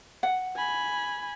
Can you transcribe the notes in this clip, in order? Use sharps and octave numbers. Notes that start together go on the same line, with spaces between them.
F#5
G#5 B5